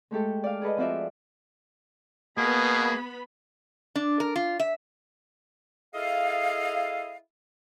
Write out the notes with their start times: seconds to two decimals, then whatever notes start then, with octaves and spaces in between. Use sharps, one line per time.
0.11 G#3 A3 G4 A4
0.44 D5 F5
0.62 G#4 A4 B4 D#5
0.77 F3 C4 F4 F#4 D5 E5
2.38 B2 A#3 B3 G#4 B5
3.95 D4
4.20 A#4
4.36 F4
4.60 E5
5.93 E4 G#4 A4 D#5 F5